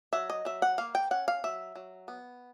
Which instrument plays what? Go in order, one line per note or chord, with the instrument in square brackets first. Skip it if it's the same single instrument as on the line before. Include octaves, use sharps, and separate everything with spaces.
[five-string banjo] F#3 E5
D#5
F#3 E5
F#5
A#3 F5
G5
C#4 F#5
F5
F#3 E5
F#3
B3